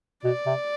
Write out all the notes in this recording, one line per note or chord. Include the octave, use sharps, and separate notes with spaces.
B2 D5
C3